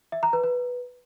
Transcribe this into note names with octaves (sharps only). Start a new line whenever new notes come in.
E5
A#5
B4
B4